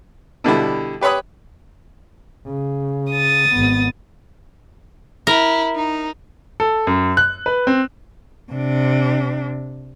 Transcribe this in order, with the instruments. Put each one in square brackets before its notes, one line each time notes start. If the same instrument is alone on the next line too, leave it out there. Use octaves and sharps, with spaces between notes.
[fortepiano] B2 D3 G3 E4
G4 B4 C#5 B5 D#6
[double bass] C#3
[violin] D#6 A6
[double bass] G#1 B3
[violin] E4 [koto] A#4
[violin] D#4
[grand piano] A4
F#2
F#6
B4
C4
[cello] C3 D4